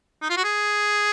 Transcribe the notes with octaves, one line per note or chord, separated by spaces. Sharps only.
D#4
F4
F#4
G#4